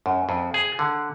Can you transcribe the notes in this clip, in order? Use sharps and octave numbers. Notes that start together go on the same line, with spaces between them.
F#2
F2
G#4
D3